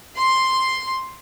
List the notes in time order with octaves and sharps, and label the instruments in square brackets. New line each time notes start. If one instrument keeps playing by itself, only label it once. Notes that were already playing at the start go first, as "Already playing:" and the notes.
[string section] C6